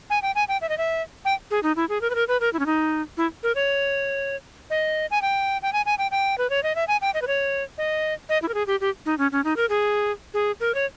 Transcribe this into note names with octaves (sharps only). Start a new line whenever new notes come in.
G#5
G5
G#5
G5
E5
D#5
E5
G5
G#4
D#4
E4
G#4
A#4
B4
A#4
B4
A#4
E4
C#4
D#4
E4
A#4
C#5
D#5
G#5
G5
G5
G#5
G#5
G5
G5
B4
C#5
D#5
E5
G#5
G5
D#5
B4
C#5
D#5
D#5
E4
A#4
G#4
G4
G4
D#4
C#4
C#4
D#4
A#4
G#4
G#4
A#4
C#5